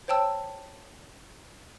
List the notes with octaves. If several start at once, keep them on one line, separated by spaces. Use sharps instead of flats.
C5 C#5 G5 A5 E6